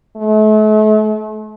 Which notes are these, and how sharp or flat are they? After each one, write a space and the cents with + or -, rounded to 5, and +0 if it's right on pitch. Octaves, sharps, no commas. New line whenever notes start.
A3 -40